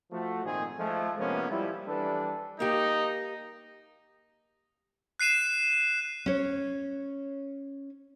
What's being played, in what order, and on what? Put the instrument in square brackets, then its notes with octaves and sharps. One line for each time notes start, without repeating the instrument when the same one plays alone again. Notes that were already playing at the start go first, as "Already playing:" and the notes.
[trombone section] F3 A3 F#4
G#1 A#2 D#3 C4 G#4
F3 G#3 A3
C3 F3 G#3 A#3 B3 C#4
F3 G3 E4
E3 G3 D4 A4 B4
[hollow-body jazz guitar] A#3 G4 [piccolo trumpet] D#4
[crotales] F#6 C7 D#7 E7
[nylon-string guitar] C#4 C#5